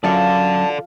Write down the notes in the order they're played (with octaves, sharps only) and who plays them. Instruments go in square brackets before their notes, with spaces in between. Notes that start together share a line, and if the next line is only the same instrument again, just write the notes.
[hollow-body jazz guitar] F#2 [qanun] F3 F5 C#6 [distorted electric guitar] A4 D5 [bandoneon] A5